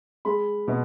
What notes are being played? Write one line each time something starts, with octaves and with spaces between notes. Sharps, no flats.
G#3 B5
B2